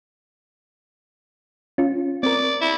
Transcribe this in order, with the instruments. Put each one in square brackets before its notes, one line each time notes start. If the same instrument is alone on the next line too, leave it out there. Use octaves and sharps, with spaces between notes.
[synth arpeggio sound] C#4 F4
[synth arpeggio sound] C4 A#4 [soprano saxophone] D5
[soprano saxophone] E4